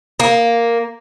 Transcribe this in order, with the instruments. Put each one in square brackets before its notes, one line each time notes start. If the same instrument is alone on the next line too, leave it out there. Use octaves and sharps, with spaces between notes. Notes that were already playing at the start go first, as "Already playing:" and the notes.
[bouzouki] A#3